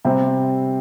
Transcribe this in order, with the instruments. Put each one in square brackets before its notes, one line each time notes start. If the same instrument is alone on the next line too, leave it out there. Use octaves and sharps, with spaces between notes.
[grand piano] C3 G3 C4